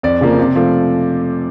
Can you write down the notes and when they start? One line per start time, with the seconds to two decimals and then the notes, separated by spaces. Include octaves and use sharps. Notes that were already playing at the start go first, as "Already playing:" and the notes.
0.03 F2 D5
0.21 C#3 F3 A#3
0.39 C3
0.56 F3 A3